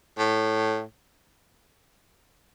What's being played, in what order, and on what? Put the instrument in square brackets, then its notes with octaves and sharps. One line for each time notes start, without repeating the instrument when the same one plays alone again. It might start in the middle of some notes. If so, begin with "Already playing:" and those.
[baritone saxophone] A2